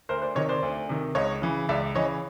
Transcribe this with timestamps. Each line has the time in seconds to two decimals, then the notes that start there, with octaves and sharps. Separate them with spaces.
0.09 D2 A#4 C5
0.22 C5 D5
0.35 C3 D#3 C#5 D#5
0.49 C5 D5
0.63 D2
0.89 C3 D#3
1.15 C#2 C#5 D#5
1.42 C#3 E3
1.69 C#2 D5 E5
1.95 C#3 E3 C#5 D#5